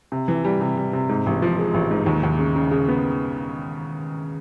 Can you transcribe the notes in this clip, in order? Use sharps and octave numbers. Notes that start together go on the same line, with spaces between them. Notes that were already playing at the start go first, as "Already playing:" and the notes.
C3
E3
G3
C3
G3
C3
G#2
A1
F3
G#3
A1
G#2
D#2
D#2
C#3
C#3
C#3
B3